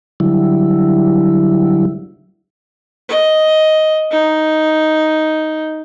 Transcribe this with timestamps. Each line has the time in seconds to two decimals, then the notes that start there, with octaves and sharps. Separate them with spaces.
0.20 D3 F#3 G3 E4
3.09 D#5
4.12 D#4